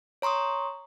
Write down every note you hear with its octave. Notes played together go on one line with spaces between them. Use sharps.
C#5 A#5 C6 C#6 D#6